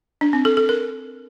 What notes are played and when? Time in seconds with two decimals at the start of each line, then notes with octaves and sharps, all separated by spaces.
0.21 D4
0.33 C4
0.45 A4
0.57 A4
0.69 A#4